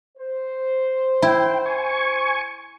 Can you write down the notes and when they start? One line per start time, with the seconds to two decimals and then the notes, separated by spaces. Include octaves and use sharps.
0.17 C5
1.22 E4 G5
1.66 G#5 C#6